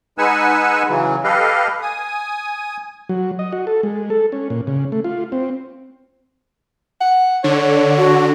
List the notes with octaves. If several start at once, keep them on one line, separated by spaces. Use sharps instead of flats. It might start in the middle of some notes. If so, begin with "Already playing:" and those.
G#3 D#4 B4 F#5 G#5 E6
C#3 E3 F#3
G4 A4 B4 D#5 F5
G#5 D#6
F#3
D#5
F#4
A4
G#3
A4
C#4
A#2
C#3
A3
F4
C4
F#5
D3 C#5
F#4